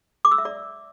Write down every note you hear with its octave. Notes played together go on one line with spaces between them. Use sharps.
D6
E6
E5
D5